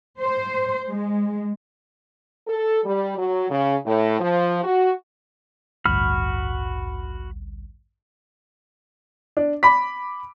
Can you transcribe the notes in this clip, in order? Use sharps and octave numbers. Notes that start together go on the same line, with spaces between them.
C5
G#3
A4
G3
F#3
C#3
A2
F3
F#4
A1 D2 G2 F#4 B5 F6
D4
B5 D6 B6